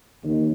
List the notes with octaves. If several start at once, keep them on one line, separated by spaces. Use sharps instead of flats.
D#2